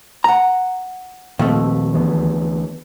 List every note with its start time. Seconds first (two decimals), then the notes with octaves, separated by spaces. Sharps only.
0.24 F#5 A#5
1.39 D#2 A#2 F3 A3 C4
1.93 D2 E3 B3